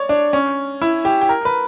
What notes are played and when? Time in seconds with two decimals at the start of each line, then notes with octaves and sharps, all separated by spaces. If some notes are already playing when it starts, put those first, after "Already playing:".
Already playing: C#5 D5
0.09 D4
0.33 C#4
0.82 E4
1.05 G4
1.21 G4
1.29 A#4
1.45 B4